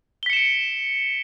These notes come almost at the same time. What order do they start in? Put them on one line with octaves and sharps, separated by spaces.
G7 B6 C#7 E7 D7